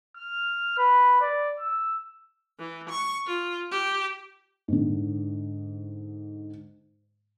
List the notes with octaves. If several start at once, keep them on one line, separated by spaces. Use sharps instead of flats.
F6
B4
D5
E6
E3
C#6
F4
G4
G#2 D3